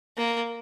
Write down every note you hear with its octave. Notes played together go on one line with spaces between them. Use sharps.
A#3